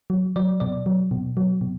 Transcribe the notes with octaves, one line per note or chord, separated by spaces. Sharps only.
F#3
F#3 D5
B2 D5
F#3
B2
F#3
B2